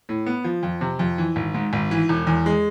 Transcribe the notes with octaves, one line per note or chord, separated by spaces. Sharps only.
A2
B3
F3
F2
C3
F2
E3
G#1
G#2
G#1
E3
E1
E2
G#3